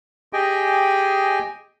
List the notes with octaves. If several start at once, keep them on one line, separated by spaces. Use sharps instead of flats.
G4 G#4 D#5 G5 G#5